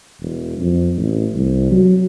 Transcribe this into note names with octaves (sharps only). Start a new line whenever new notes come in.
E1
F2
A1
C2
F#3